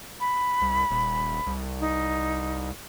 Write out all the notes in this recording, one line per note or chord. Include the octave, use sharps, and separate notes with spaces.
B5
C2
D#1
C2
D#4